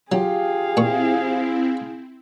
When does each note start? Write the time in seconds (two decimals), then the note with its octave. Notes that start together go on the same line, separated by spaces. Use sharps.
0.12 F#3 F4 G4 G#4 F5
0.77 A#2 C4 E4 C#6